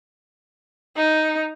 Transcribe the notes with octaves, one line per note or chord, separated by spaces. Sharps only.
D#4